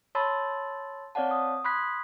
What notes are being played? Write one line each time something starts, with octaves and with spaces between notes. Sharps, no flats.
C#5 A5 B5 C6 E6 A6
C4 C#5 D5 F5 F#5 A5
D#6
B5 C6 D#6 F#6 G#6 B6